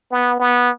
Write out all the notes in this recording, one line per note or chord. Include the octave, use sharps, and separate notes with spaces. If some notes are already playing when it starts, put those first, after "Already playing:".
B3
B3